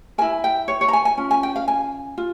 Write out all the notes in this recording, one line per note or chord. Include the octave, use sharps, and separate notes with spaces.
E4 A#4 G#5
G5
C#5
C#5
A#5
G#5
G#5
C#4 F4
G#5
G5
F5
G#5
F4